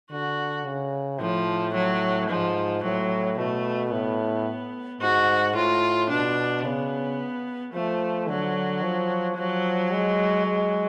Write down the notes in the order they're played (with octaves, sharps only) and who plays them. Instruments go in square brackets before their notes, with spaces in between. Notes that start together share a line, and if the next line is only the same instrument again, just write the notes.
[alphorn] D3 [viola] F#4
[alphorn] C#3
[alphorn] A2 [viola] F3
[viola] F#3
[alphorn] G#2 [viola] F3
[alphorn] A2 [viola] F#3
[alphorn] B2 [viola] A3
[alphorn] A2 [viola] B3
[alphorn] G#2 [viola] F#4
[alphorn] A2 [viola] F4
[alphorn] B2 [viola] D4
[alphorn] C#3 [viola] B3
[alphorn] F3 [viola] A3
[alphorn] D3 [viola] F#3
[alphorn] F3
[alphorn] F3 [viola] F#3
[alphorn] G#3
G#3